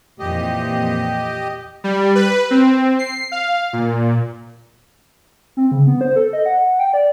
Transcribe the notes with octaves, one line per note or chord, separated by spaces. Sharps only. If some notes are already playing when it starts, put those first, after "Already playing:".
F2 A#2 E3 G4 D#5
G3
B4
C4
C7
F5
A#2
C4
C#3
B3
C5
A4
D#5
F#5
G5
D5